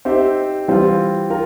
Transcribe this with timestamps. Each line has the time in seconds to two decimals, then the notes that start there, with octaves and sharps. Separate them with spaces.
0.05 C4 D#4 G4 C5 E5
0.68 E3 G3 C4 F4
1.30 F4 A#4